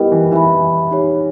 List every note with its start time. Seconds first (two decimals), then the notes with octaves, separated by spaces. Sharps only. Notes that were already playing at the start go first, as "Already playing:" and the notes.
Already playing: G3 B3 E4 G4 A#4 D#5 G5
0.12 E3
0.32 E3 B4 E5 G#5 B5
0.91 D#4 G4 C#5